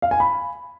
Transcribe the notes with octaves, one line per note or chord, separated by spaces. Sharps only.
F5
G#5
B5